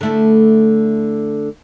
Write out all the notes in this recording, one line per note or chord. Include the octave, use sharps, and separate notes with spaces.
D3 A3 E4